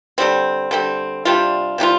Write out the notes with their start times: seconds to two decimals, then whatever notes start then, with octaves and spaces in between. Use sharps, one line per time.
0.18 D3 G3 C4
0.71 D3 G3 C4
1.25 C3 G3 D4 F4
1.78 C3 G3 D4 F4